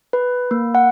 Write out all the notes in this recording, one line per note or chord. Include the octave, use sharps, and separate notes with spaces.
B4
A#3
F#5